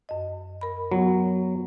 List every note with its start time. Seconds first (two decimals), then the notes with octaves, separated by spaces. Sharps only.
0.09 F#2 D#5
0.61 A#4 B5
0.92 F#3 B3